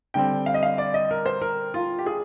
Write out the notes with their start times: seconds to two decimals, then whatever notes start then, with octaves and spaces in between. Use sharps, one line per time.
0.14 D3 G3 C4 G5
0.46 F5
0.54 D#5
0.63 F5
0.78 D5
0.94 D#5
1.11 A#4
1.26 C5
1.42 A#4
1.74 F4
1.98 G4
2.06 G#4